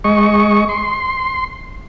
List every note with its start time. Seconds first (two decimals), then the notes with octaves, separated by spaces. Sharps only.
0.04 G#3 D#5 C#6
0.69 C6